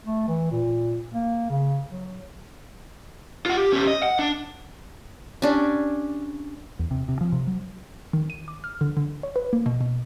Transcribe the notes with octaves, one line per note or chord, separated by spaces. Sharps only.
A3
E3
A#2
A#3
C#3
F#3
F4 F#5
G4
C#4 G4
D#5
F#5
D4
C#4 D4 G4
E2
C3
C3
F3
C3
F#3
D#3
D#7
D6
F6
D3
D3
C#5
B4
A#3
B2
B2